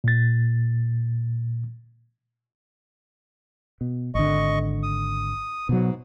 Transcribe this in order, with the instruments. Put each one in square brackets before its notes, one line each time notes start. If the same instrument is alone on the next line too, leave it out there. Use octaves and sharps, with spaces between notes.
[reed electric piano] A#2 A6
[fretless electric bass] B2
[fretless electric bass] G#1 D3 [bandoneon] D#5 C#6
[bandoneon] D#6
[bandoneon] G#2 [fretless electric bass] B2 F#3